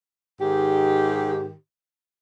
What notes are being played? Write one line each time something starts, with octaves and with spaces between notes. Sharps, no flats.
G#2 D#3 G4